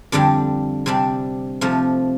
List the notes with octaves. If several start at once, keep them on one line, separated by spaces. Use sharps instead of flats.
F2 D3 G3 D4
C3 G3 D4
C3 F3 A3